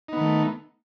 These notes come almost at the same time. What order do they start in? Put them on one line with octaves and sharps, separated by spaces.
D#4 B3 D#3 A3